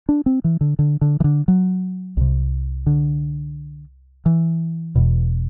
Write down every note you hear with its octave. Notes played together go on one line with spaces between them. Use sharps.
D4
C4
E3
D3
D3
D3
E3
D3
F#3
C2 C3
D3
E3
E1 E2 B2